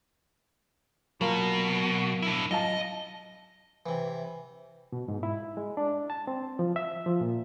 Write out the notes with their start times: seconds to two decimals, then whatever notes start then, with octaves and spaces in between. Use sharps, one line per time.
1.21 B2 F#3 A#3 F4
2.22 D4 E4
2.51 F#2 F4 D#5 A5
3.86 C3 E3
4.92 B2
5.08 G#2
5.23 E4
5.57 G#3
5.77 D4
6.10 A5
6.27 C4
6.59 F3
6.76 E5
7.06 F3
7.21 A#2